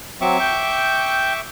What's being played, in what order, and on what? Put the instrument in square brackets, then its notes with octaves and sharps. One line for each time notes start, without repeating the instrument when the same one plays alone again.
[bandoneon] F#3 C4 [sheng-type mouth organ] E5 C#6 D6
[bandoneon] G5 G6